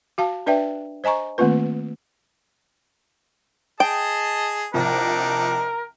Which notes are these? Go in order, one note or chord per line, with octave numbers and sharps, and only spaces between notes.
F#4 F5 A5
D4 B4 D5 E5 G5
C5 D#5 G#5 A#5 C#6
D#3 A3 A#3 C4 F4 B4
G#4 D#5 G5 A5
C2 C3 F3 D4 D#4 A#4